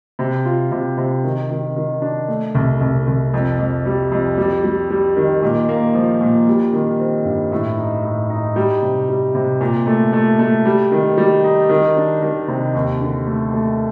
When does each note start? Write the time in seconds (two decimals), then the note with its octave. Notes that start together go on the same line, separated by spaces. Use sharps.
0.19 C3
0.45 F4
0.71 C3
0.97 C3
1.24 D#3
1.50 D#3
1.76 D#3
2.02 D4
2.28 A3
2.55 C2
2.81 C2
3.07 C2
3.34 F2
3.59 F2
3.85 G3
4.12 F2
4.38 G3
4.64 G3
4.91 G3
5.17 D#3
5.42 A#2
5.69 A#3
5.95 F3
6.21 A#2
6.47 G3
6.73 D#3
7.00 C4
7.25 G2
7.52 A2
7.78 D#4
8.04 A2
8.30 D#4
8.56 G3
8.82 C3
9.09 G3
9.35 C3
9.61 A#2
9.87 A3
10.13 A3
10.39 A3
10.65 G3
10.92 D#3
11.17 G3
11.44 D#4
11.70 D#3
11.96 D4
12.22 D#3
12.48 C3
12.75 D#2
13.01 D3
13.27 A3
13.53 A3